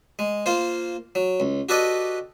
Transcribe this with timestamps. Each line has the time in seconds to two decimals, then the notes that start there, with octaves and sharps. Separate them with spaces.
0.19 G#3
0.46 A#3 F4 C5
1.15 F#3
1.40 C#2
1.69 F#4 G4 A4 B4 D5 D#5